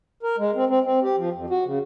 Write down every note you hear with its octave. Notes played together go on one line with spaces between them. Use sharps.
A#4
G#3
C4
C4
C4
G4
F3
F2
F#4
C#3